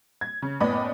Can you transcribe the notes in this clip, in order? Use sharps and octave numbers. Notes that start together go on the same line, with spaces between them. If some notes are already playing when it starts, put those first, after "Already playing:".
G#6
C#3
F#1 A2 B3 D5 D#5 B5